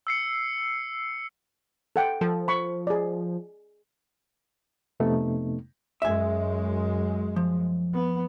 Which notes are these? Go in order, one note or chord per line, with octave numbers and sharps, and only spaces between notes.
E6 C7 C#7
A4 F#5 G5
F3 A4
B5 C#6
G#4 D5
F2 C3 A3 B3 D#4
F#2 G#3 E5 G#5
F3
B3